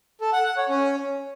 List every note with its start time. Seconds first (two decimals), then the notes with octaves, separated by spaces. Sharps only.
0.21 A4
0.33 F#5
0.45 F#5
0.57 C#5
0.69 C#4